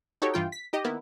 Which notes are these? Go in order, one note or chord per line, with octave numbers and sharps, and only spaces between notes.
D#4 F#4 G4 A4 C#5
G2 E3 F4 G5
B6
D#4 G4 D#5
D#3 A#3 B3 E4